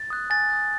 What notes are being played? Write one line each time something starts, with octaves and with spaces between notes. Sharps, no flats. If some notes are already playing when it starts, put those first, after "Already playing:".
Already playing: A6
D#6 F#6
G#5 A6
D#6 F#6